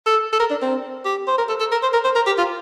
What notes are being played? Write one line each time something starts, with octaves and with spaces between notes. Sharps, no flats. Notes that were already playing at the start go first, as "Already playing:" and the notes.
A4
A4
A#4
D4
C4
G4
C5
A#4
A4
A4
A#4
C5
A#4
C5
A#4
G4
F4